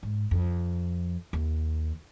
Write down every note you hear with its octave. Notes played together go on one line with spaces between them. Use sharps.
G#2
F2
D#2